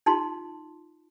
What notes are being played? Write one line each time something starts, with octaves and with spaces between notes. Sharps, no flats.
D#4 F4 A5 C6